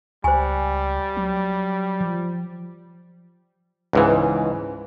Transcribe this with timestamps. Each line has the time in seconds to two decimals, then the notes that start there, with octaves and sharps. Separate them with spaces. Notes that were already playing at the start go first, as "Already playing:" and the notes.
0.24 C#2 G3 C5 G#5
1.17 F#3
2.00 F3
3.93 C#2 G#2 E3